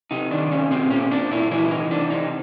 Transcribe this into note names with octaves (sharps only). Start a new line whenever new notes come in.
C3 D#4
D#3 D4
C3 C#4
A#2 C4
A#2 C#4
A#2 D4
A#2 E4
E3 E4
C3 D#4
E3 D4
C3 D#4